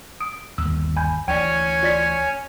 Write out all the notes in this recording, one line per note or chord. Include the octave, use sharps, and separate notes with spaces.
D#6 D7
G1 D#2 E6
G#5 B5 G6
D2 E3 C#4 C#5 D5 G5 G#5
F4 D5 B6